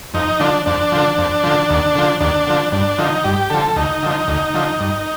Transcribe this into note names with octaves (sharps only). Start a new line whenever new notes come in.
F2 D#4
D3 F3 D4
F2 D4
D3 F3
F2
D3 F3
D#2
D3 F3
D#2 D4
D3 F3
G2 D4
D3 F3 D#4
G2 G4
D3 F3 A4
D2 D#4
D3 F3
D2
D3 F3
G2